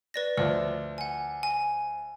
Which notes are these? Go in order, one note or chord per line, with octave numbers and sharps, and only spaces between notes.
B4 D5 A#6
D2 F3 D5
F#5 G#5
G#5